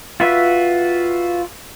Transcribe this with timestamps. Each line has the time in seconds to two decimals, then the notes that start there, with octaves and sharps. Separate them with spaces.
0.20 F4 F#4 B4 E5